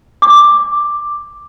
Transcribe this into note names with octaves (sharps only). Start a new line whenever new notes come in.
D6